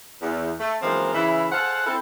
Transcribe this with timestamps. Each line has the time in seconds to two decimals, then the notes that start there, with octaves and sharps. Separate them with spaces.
0.21 E2
0.60 A3
0.82 F#2 E3 F3 G#3 A#3 C4
1.13 C#3 E3 E4
1.51 G#4 A4 C5 F5 F#5
1.86 C4 E4 A4